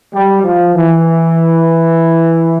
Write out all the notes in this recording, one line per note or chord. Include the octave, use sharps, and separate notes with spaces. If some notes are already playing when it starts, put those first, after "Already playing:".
G3
F3
E3